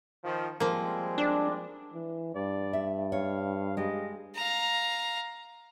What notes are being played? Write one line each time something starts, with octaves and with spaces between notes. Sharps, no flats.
D#3 F3
F3 G3 G#3 A#3 C4
D4 D5
E3
G2 D5
E5
C#5 F5
G#3 G4 D#5
F5 A#5